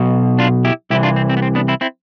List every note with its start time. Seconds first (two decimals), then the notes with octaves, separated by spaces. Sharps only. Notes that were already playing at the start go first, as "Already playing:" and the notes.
Already playing: B1 B2
0.38 D4 F4
0.65 E4 G4
0.90 C2 C3 E3 E4 G4
1.03 D4 F4
1.16 C4
1.30 C4
1.37 B3
1.42 C4
1.55 B3 D4
1.68 C4 E4
1.81 C4 E4